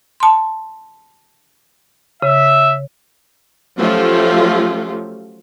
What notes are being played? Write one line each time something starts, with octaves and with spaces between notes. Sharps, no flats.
A5 C6
C#3 E5
F3 F#3 A3 C#4 F4 G4